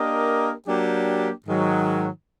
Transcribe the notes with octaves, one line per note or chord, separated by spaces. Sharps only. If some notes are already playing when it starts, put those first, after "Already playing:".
Already playing: A#3 D4 G4 A#4 D#5
F#3 A#3 D4 G4
G#2 D#3 F#3